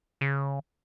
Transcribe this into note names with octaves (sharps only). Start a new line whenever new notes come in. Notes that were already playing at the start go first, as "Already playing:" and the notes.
C#3